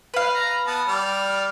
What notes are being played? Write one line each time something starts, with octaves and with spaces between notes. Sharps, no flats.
B4 F5
A#5
B3 A5
G3 D5 F6